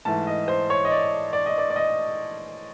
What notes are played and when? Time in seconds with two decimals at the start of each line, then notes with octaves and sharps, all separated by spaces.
0.05 G#2 E3 A3 A5
0.27 D#5
0.48 C5
0.70 C#5
0.85 D#5
0.91 D5
1.33 D5
1.46 D#5
1.58 D5
1.70 D5
1.76 D#5